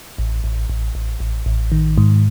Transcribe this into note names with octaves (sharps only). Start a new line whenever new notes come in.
A1
A1
A1
A1
A1
A1
D#3
G#2